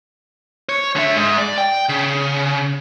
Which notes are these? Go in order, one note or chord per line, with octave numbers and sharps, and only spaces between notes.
C#5
D3 E5
G#2
D5
G5
C#3